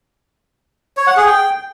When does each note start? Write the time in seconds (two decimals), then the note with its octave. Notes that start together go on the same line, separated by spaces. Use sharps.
0.97 C#5
1.07 F#5
1.17 G#4
1.27 G5